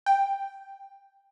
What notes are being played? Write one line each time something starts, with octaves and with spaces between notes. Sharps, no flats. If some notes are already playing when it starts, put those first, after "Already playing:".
G5